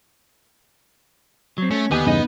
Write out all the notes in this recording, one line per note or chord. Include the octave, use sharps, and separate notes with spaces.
F#3 C4
A3 C#4
D#2 D3 B3 G4 D#5 G#5
E2 G2 C#3 D#4 D#5